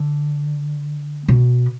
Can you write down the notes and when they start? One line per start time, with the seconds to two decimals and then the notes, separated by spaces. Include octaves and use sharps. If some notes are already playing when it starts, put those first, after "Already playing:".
Already playing: D3
1.28 B2